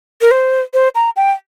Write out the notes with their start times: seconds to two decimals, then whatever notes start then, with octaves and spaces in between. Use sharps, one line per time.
0.21 A#4
0.31 C5
0.74 C5
0.95 A#5
1.16 G5